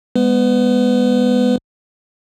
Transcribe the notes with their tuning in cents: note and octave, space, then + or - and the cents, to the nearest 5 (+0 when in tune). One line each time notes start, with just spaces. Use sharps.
G#3 -25 B3 -5 B4 +30